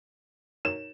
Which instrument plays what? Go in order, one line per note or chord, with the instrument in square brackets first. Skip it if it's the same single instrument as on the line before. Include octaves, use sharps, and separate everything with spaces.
[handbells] D#4 A#4 C#5 [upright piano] E7